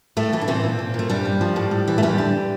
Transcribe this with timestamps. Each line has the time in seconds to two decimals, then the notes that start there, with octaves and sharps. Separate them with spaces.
0.17 A2 A3
0.32 E3 A3
0.41 D4
0.48 C3 E3 C4
0.63 A#2
0.79 A#2
0.94 A#2 A3
1.10 G2 G3
1.25 G2
1.41 F3
1.56 A2
1.71 A2
1.88 E3
1.98 A3
2.03 F2 G3
2.18 D3